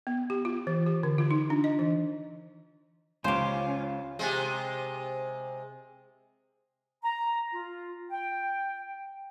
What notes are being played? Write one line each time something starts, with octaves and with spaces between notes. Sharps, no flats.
B3
G4
F4
E3
G4
D3
F4
D#4
D4
D#5
E3
C#2 C#4 F4 G4 C5 C#5
C3 G#3
A#5
F4
G5